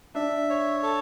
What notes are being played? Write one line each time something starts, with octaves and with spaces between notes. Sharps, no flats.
D4 E5
C#5
A4